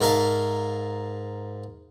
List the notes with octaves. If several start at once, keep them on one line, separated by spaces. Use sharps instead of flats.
G#2 A#4 E5 F5 A5